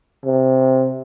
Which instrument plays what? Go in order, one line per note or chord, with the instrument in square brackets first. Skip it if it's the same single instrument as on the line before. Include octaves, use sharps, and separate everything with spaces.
[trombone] C3